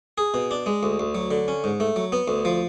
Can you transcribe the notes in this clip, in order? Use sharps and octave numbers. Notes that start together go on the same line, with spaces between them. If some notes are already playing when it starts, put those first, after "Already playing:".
G#4
B2
D4
G#3
D2
D2
F#3
D3
C#4
G#2
A3
F#3
B3
D2
F3